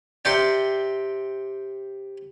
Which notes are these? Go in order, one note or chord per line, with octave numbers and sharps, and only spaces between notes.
C3 C5 D5 G5